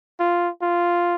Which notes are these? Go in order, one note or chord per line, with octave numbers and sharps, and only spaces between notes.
F4
F4